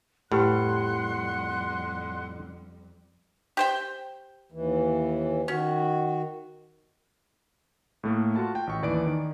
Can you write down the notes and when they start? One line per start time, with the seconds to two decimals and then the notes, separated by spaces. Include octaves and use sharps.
0.32 F2 A2 G3 G4 B4 F#5 C6 F#6
3.57 G4 C5 G5
4.52 D#2 E3
5.48 D#3 C#4 F#4
8.03 A2 A3 A#3
8.36 F4 F#4 A5
8.55 G5
8.67 A1 C#6
8.82 D#2 E3 D5 G#5 D7
9.07 D#3